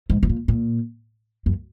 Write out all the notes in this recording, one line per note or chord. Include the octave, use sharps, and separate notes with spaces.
G#2
G#2
A#2
A#2
F#2